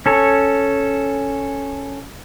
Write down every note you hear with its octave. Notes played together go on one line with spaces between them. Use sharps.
C#4 A4 C#5